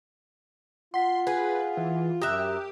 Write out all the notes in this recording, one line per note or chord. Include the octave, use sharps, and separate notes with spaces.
F4 F#5 C6 B6
G#4 B4
E3
F#2 G4 E5 A#5 D#6 F#6